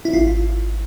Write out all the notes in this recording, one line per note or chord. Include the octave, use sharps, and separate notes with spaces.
E4
G#1 F4